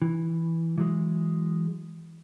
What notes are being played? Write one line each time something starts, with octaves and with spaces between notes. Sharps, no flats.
E3
E3 F#3 G#3